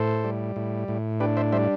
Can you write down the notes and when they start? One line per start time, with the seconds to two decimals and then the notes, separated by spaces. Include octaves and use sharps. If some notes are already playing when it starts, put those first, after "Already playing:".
Already playing: A2 A4 C5
0.24 G3
0.56 A2
0.88 A2
1.20 D4 G4 B4
1.37 C5 E5
1.52 G3 C5 E5